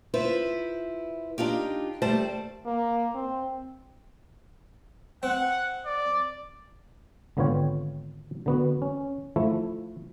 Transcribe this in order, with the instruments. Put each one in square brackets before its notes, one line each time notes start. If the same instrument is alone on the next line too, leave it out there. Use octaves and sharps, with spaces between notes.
[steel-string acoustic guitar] E4 F4 B4 C5 E5
D4 D#4 F4 G4
D#2 G3 A3 C5 D5 A5
[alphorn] A#3
C4
[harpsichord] C4 [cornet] F#5
[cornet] D5
[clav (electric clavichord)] G#1 D3 B3 F4 C#5 G5
D3 B3 F#4
C#4
F3 A3 E4